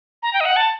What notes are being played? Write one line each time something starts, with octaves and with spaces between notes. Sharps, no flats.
A#5
G5
D#5
F#5
A5